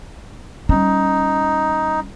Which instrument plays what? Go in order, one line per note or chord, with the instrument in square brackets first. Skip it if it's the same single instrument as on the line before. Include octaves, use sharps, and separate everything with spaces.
[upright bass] G3 C#4 [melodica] D#4